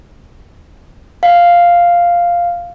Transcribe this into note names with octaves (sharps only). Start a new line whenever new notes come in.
F5